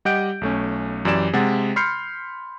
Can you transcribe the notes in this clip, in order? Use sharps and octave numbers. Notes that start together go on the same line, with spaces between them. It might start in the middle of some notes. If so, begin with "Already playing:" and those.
G3 G4 D#5 F#5 G6 D7
B1 A3 C#4
F#2 E3 G4 D5 E7
C3 G#3 F#5 A6
B5 C6 F6 G6 C7 C#7